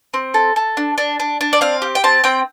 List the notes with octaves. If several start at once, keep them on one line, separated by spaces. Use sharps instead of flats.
C4
A4
A4
D4
D4
D4
D4
D5
C4 F5
G4
G5
C4 A5
C4 G5